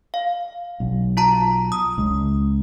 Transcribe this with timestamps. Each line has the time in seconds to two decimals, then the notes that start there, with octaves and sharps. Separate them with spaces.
0.14 F5
0.80 B1
1.17 F4 A5 A#5
1.72 D#6
1.98 C#2